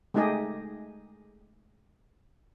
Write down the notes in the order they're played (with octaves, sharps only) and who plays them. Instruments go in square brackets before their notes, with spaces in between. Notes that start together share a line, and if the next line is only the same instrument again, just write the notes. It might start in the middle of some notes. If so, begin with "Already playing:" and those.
[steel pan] G#3 A3 D#4 G4 G#4 D#5